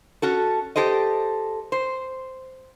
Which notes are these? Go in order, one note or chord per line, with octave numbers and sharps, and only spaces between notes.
C#4 F#4 A4
G4 A4 C5 D#5
C5